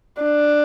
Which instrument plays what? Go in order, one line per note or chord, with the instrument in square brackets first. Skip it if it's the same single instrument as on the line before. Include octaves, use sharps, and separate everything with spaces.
[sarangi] D4